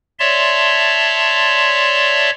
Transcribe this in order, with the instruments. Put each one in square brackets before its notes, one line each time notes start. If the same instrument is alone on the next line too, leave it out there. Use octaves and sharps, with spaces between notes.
[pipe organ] C#5 D5 E5 A5 C6